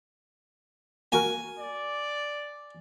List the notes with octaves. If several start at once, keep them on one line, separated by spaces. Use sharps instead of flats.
A#3 F#4 A#4 G#5
D5